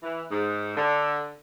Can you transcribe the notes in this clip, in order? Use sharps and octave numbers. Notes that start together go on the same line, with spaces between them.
E3
G#2
D3